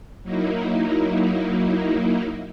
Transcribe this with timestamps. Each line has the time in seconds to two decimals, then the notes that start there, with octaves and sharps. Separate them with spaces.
0.23 F#3 A#3 D#4 E4